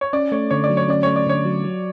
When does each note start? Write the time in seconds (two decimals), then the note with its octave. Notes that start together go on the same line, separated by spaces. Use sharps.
0.01 C#5
0.13 C#4 D5
0.32 A3 C#5
0.51 D3 C#5
0.64 D5
0.70 F#3
0.77 C#5
0.88 C#4 D5
1.03 A3 C#5
1.16 D5
1.27 D3 C#5
1.45 F#3
1.64 F#3